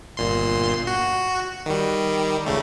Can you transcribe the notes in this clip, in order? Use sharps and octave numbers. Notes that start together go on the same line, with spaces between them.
G1 A#2 C6
F#4
D#3 G3
C#2 C#3 A3